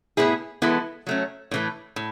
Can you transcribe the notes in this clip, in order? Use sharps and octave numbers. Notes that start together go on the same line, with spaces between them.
A2 E3 B3 E4 G#4
E3 G#3 B3 E4 A4
F#3 A3 C#4
A2 E3 A3
A2